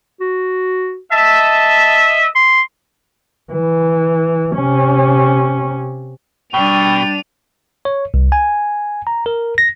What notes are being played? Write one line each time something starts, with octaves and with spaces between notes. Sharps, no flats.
F#4
D#5 E5 A5
C6
E3
C3 C#4
B2 G3 D4 G5 D#7 F7
C#5
C2
G#5
A#5
A#4
A#6